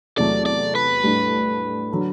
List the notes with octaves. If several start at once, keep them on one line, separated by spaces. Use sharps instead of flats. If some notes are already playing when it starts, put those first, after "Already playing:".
E2 C3 F#3 A3 D5
D5
B4
A2 G3 D4
D3 F#3